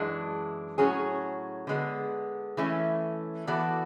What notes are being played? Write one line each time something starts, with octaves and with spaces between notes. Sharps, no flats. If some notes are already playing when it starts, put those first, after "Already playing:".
Already playing: F#2 E3 G#3 D4
A2 F#3 C#4 G#4 C#5
D3 G#3 B3
E3 A3 C#4
E3 B3 F#4 A4 D5